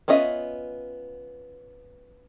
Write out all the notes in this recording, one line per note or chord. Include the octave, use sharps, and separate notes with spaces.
B3 C#4 F4 D#5 E5